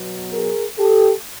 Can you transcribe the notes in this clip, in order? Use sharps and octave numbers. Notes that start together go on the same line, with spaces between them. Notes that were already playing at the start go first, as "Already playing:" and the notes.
Already playing: B2 F#3 B3
G#4 A#4
G4 A4